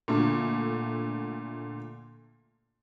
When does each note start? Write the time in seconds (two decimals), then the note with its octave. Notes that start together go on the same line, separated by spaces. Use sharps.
0.08 A#2 D3 A3